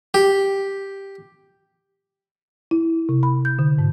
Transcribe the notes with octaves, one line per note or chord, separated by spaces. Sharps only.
G4
E4
C3
B5
G6
D3
G#2